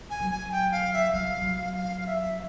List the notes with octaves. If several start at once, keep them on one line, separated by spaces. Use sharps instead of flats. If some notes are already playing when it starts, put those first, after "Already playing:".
G#5
F#3
G#5
G5
F5
E5
F#3 F5
F#3
F5
F5
E5